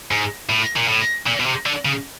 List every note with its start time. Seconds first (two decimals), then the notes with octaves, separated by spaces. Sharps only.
0.11 G#2
0.50 A2
0.77 A#2
0.88 A2
1.27 A#2
1.40 B2
1.46 C3
1.66 D3
1.85 C#3